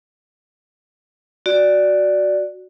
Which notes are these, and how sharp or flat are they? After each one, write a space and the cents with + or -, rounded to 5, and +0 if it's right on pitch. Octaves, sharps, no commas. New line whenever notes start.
F#4 +0 D5 +0